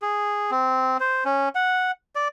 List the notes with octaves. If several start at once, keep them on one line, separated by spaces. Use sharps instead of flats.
G#4
C4
C5
C#4
F#5
D5